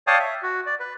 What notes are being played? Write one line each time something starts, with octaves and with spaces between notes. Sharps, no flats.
C#5 D5 F5 G5 A5 D#6
E5
F#4
D5
B4